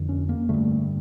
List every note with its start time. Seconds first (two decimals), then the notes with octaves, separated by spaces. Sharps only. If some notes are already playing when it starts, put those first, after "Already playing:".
Already playing: F2 D3
0.09 C#4
0.29 A#3
0.49 G2 D3 A3